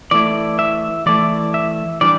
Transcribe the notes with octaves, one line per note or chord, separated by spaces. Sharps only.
E3 A3 E4 D5
E5
E3 A3 E4 D5
E5
E3 G3 D4 D5